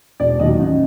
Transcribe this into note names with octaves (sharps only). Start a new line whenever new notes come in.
E1 D5
D#2 D#3 F#3 D#5
A1